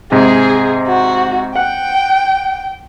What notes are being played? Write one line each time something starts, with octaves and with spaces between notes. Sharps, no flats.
G#2 C3 G#4
F#4
F#5 G5